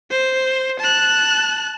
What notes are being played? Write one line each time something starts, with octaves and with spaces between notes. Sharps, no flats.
C5
A5 F#6